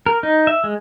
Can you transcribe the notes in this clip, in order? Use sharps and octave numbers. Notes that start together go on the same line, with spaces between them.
A#4
D#4
E5
G#3